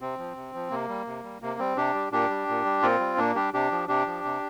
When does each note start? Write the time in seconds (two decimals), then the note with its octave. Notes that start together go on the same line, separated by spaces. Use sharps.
0.01 C3 C4
0.19 F3
0.37 C3
0.54 F3
0.71 C3 A#3
0.88 G3
1.07 C3
1.24 G3
1.42 C3 A#3
1.59 G3 C4
1.77 C3 D4 G4
1.94 G3
2.12 A#2 D4 G4
2.30 G3
2.48 A#2
2.65 G3
2.82 A#2 C4 F4
3.00 G3
3.18 A#2 A#3 D4
3.35 G3 D4 G4
3.54 C3 D4 G4
3.71 F3
3.88 C3 D4 G4
4.07 F3
4.24 C3